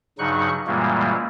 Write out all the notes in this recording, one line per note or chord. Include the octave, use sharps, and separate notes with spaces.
G2 C#3 F#3 D#4 C#6 F#6
F#2 A#2 E3 G3 G#3 A#3